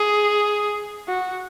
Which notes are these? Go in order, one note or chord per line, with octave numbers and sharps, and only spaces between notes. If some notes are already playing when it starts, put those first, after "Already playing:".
Already playing: G#4
F#4